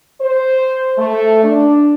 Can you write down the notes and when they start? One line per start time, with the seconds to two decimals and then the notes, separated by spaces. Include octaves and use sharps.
0.21 C5
0.98 A3
1.44 D4